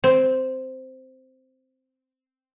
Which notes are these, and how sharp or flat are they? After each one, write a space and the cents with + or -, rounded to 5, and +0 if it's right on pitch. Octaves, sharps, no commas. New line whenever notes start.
C4 -5